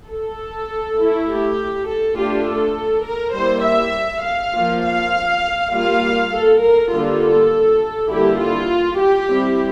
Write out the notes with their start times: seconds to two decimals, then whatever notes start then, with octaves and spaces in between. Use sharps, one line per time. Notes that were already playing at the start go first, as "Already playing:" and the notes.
0.10 A4
0.98 A3 E4
1.28 G4
1.88 A4
2.16 A3 D4 F4 G4
2.47 A4
3.06 A#4
3.35 G3 A#3 E4 C5
3.65 E5
4.24 F5
4.54 F3 A#3 F4
4.84 F5
5.73 G3 A#3 F4 F5
6.33 A4
6.63 A#4
6.92 D3 G3 A#3 F4 A4
8.10 D3 G3 A#3 E4 G4
8.40 F4
8.99 G4
9.30 G3 C4 E4